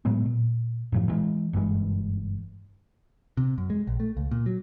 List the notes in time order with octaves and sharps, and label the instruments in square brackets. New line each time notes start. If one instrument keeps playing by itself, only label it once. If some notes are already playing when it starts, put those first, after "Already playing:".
[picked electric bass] A2 F#3 G#3 B3
A#2
F#2 A2 F3
E3 G3 G#3
F#1 G2 E3 G#3
C3
F#2
G#3
A#1
A3
C#2
A#2
F#3